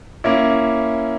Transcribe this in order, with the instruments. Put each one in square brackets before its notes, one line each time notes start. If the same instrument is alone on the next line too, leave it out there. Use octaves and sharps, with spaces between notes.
[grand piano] A#3 C#4 E4